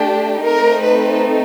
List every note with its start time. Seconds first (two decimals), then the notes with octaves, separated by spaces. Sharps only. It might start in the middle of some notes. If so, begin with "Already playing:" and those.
Already playing: A3 D4 G4
0.42 A3 C4 D#4 A#4
0.81 B4